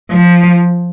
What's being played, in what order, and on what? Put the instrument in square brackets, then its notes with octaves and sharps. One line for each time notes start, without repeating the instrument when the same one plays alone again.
[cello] F3